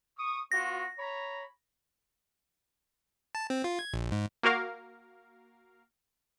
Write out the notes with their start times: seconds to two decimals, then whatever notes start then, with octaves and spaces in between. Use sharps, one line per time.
0.18 C#6 D#6
0.52 B3 F4 F#4 A#6
0.98 C#5 A#5 B5
3.35 A5
3.50 C4
3.64 F4
3.79 G#6
3.93 A#1
4.11 G#2
4.43 A#3 F#4 A#4 F5